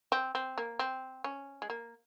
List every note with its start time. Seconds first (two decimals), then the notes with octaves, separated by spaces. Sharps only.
0.12 C4
0.35 C4
0.58 A#3
0.79 C4
1.24 C#4
1.62 G#3
1.70 A#3